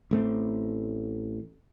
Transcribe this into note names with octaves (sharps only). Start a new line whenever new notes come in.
A1 A3 C4